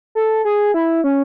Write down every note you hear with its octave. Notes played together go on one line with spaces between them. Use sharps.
A4
G#4
E4
C#4